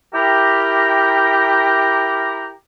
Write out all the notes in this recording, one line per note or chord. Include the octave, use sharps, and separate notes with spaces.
E4 G4 A#4 A#5